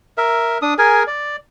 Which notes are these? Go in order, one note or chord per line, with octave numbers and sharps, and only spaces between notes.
A#4 E5
D4 D#6
G#4 A#4 G#5
D5